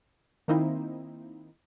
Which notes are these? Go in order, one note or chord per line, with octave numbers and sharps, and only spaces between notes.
D#3 A#3 C4 D#4 E4